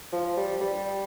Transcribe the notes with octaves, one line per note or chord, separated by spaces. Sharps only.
F3
G3
G3